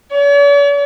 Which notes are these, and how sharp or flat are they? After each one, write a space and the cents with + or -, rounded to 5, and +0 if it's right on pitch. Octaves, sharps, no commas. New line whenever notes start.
C#5 +45